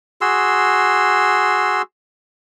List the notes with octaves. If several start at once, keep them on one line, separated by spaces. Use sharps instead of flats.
F#4 G#4 C6 E6